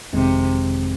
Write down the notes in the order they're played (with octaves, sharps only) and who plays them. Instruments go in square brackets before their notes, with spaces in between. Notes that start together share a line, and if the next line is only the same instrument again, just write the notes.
[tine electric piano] G1 F2 D#3 G#3 C4 [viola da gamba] C3